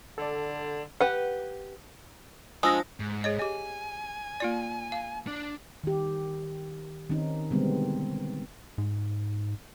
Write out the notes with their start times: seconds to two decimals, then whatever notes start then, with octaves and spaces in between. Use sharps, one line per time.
0.18 D3 A4 D5
1.01 G4 B4 F#5
2.63 F3 G#3 D4 D#6 E6 A#6
3.00 G#2
3.24 G#4 C#5 D#5
3.39 G4 D#5 G#5
4.40 A#3 F4 D5
4.92 F5
5.27 D4 D5
5.84 D#3 G4
7.10 D#3 C4 C#4 D#4
7.51 B2 D3 G3 G#3 B3 C4
8.78 G#2